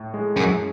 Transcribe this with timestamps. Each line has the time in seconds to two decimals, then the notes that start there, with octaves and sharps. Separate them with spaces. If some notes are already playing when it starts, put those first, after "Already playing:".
Already playing: A2
0.14 G#3
0.36 F#2